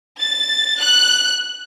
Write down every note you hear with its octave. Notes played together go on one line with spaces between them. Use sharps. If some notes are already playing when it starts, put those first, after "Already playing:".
A6
F#6